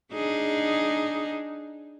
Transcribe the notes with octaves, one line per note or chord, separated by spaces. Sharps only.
D4 D#4 G#4